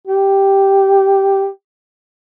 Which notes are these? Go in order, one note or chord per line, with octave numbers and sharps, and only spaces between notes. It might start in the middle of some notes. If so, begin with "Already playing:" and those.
G4